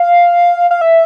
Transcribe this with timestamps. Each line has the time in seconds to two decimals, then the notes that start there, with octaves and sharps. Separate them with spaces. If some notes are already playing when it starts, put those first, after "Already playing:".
Already playing: F5
0.71 F5
0.81 E5